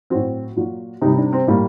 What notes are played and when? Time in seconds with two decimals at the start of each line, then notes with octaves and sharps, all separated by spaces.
0.10 A2 F#3 C4
0.56 A#2 F#3
1.02 C3 D#4
1.06 G3
1.13 D#4
1.18 D4
1.33 C4
1.47 A2 G3 A#3